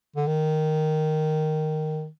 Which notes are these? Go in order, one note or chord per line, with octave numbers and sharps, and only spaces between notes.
D3
D#3